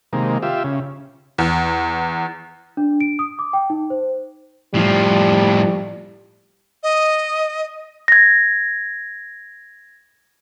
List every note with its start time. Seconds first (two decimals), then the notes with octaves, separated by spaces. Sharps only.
0.13 C3 D#3 G#3 A#3
0.42 F4 G4 E5
0.64 C#3
1.38 E2
2.77 D4
3.01 D7
3.19 D#6
3.39 D6
3.53 G5
3.70 D#4
3.90 C5
4.74 A2 F3 G3
6.83 D#5
8.08 G#6 A#6